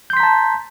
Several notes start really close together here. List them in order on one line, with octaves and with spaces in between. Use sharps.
G6 C6 B6 A#5 A5